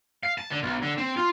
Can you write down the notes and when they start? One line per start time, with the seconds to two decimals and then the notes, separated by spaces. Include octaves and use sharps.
0.23 F5
0.38 A5
0.51 D3
0.63 B1
0.83 D3
0.98 C4
1.17 F4